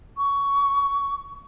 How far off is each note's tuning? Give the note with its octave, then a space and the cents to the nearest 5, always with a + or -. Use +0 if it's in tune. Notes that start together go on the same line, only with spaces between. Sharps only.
C#6 +15